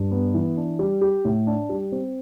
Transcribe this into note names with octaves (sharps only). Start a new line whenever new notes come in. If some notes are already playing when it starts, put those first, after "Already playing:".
Already playing: G2
B3
E3
D4
G3
G4
A2
D4
G3
C4